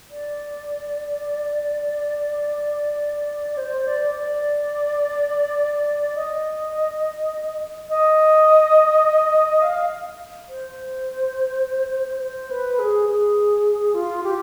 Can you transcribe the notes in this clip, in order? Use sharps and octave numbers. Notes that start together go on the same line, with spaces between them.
D5
C5
D5
D5
D#5
D#5
F5
C5
C5
B4
G#4
G#4
F4
G4